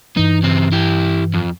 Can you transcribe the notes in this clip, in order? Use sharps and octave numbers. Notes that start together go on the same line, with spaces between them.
G2 E3 D#4
C#3 C4
E4 G4
F2